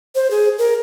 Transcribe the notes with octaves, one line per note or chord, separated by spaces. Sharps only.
C5
G#4
A#4